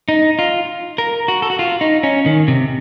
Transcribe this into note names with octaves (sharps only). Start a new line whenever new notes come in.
D#4
F4
A#4
F#4
A4
F#4
F4
D#4
C#4
D#3
C3